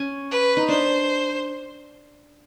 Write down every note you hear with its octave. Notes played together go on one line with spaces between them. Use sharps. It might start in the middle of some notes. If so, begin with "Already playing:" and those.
Already playing: C#4
B4
D#4
D4 C5